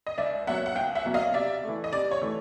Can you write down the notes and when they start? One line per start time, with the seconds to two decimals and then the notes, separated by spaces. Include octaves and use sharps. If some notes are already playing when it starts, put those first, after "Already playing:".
0.07 D#5
0.18 C#2 D5 E5
0.47 B2 F#3 A#3 C#4 E5 F#5
0.66 F#5
0.76 C#2 F5 G5
0.95 E5 F#5
1.05 B2 F#3 A#3 C#4
1.14 D#5 F5
1.34 C3 D5 E5
1.63 A3
1.68 E3
1.84 D#5
1.92 C3 D5
2.11 C#5
2.22 E3 A3